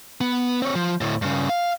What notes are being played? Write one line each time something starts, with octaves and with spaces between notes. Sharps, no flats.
B3
C4 C#5
F3
D2 A2
G2 C#3
F5